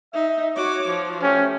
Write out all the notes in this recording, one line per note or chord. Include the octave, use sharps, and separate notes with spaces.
D#4 E5
F#4 C#5 D6
F3
A3 C#4 G4